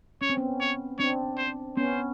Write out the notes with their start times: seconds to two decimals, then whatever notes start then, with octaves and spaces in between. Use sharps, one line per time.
0.21 C#4 C#5
0.30 C4
0.37 B3 C#4
0.61 C#5
0.99 C4 D4 C#5
1.38 C5
1.77 B3 C#4 C5